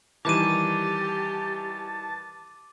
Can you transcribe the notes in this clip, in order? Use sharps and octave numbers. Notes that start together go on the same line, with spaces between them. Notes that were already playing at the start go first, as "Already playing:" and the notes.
D#3 E3 G3 G4 A5 D6 D#7